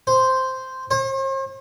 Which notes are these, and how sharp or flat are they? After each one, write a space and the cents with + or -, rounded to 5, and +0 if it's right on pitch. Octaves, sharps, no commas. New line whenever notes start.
C5 -5
C5 +45